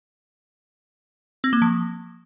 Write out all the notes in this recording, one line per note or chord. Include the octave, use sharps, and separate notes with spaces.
C4
A#3
F3